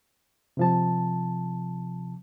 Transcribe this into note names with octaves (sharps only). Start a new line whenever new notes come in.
C3 F3 A5